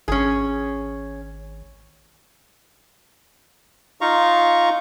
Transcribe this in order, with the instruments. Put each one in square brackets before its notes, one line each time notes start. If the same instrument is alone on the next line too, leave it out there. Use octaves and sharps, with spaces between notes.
[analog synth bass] G#1 [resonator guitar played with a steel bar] C#4 G#4
[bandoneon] D#4 F4 F5 A#5 C#6